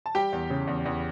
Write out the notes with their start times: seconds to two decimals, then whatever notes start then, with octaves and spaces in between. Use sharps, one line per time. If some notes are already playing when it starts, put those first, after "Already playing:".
0.06 A5
0.15 G3 G4 G5
0.33 E2
0.50 C#3
0.67 E2
0.85 E2